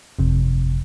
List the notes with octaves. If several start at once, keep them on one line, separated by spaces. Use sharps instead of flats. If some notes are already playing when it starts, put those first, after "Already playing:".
G1 F2 C3